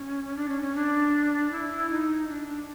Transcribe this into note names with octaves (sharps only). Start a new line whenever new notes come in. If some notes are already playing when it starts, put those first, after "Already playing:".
Already playing: C#4
D4
C#4
C#4
D4
E4
D#4
D4
D4